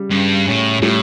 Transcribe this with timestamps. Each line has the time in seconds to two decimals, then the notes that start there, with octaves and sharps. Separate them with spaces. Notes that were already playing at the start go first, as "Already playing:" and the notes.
Already playing: C#3 G3
0.11 G2 C#3
0.47 A2 C#4
0.82 A2 G3